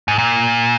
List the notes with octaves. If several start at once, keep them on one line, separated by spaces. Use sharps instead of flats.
G#2
A#2